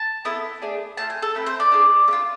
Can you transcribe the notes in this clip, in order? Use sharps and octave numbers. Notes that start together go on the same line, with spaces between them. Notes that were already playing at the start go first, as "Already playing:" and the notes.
Already playing: A5
B3 E4 A4
A3 D4 G#4
A3 D4 F4 A5
G#5
A4
A3 C4 E4 B4
C5
D5
D4 G#4
A3
D4 F4